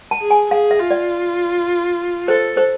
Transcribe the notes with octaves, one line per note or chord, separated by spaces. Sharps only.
A5
G#4
G#5
G#4 F5
E5
F4
D5
A4 C5
C5